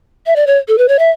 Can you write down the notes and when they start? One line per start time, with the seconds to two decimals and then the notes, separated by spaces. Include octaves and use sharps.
0.27 E5
0.36 D5
0.47 C#5
0.68 A4
0.78 B4
0.88 C#5
0.99 E5